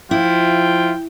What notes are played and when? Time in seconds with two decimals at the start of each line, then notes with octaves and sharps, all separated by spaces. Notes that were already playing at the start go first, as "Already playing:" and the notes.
0.11 F3 E4 F4 G5